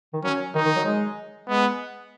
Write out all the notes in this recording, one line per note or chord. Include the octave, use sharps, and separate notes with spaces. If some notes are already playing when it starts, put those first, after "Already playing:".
D#3
F#3 C#4
D#3 D#4
D#3
F#3
G#3
G#3 B3